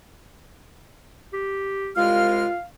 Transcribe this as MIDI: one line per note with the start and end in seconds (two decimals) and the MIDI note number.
1.33 1.91 67
1.97 2.46 36
1.97 2.46 56
1.97 2.55 65
1.97 2.64 77
1.97 2.46 89